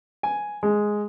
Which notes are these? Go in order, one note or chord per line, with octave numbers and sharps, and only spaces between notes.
G#5
G#3